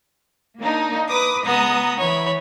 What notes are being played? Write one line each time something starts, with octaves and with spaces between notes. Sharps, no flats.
A#3 D4 D#4
B4 D6 D#6
C#2 B3 A#5 D#6
E3 C#5 B5